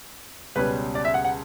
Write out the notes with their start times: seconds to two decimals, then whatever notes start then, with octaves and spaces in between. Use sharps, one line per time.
0.56 C#2 B2 G3 C#4 B4
0.95 D5
1.05 E5
1.14 F#5
1.25 F#5